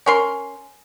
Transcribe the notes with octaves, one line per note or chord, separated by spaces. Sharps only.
C#4 A#4 C6